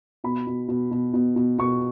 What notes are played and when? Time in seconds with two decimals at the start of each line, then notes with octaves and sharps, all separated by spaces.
0.24 B2 B5
0.47 B2
0.68 B2
0.91 B2
1.13 B2
1.36 B2
1.58 B2 C#6